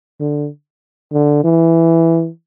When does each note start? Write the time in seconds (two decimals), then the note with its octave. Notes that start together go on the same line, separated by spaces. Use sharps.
0.20 D3
1.13 D3
1.44 E3